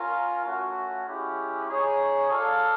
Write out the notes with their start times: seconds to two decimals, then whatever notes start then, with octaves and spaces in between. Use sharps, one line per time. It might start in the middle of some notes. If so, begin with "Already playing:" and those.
Already playing: C#4 F4 A#4
0.44 A3 C#4 F#4
1.06 G#3 C#4 E4 G4
1.68 D#4 G#4 C#5
2.30 F4 A4 D5 F5